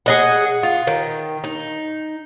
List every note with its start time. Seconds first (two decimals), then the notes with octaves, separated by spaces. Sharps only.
0.06 G#4 D#5 F#5
0.63 F4
0.87 D#3
1.44 D#4